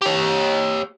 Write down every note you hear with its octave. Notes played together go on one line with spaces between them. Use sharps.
G4 C#5